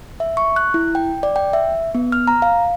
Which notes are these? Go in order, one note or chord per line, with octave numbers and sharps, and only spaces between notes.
E5
C#6
F#6
E4
G5
D5
G5
E5
B3
F6
A#5
F5